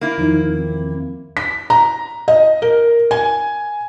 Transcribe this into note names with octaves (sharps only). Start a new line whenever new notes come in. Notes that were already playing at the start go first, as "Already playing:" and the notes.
A#3 E4
E2 D#3 F3 D#4
C4
B6
A#5
D#5
A#4
G#5